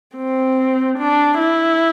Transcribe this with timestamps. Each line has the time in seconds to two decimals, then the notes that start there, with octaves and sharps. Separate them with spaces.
0.17 C4
0.98 D4
1.39 E4